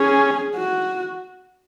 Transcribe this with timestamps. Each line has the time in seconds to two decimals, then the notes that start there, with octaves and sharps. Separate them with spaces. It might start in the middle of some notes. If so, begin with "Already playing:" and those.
Already playing: C#4 G#4
0.55 F#4